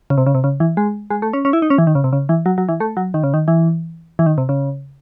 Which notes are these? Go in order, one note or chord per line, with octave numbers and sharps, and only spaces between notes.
C#3
C3
C#3
C3
C#3
E3
G#3
G#3
A3
C#4
C#4
E4
D#4
C#4
E3
D#3
C#3
C3
C#3
E3
F#3
F#3
E3
A3
F#3
D#3
C#3
D#3
E3
E3
D#3
C3
C#3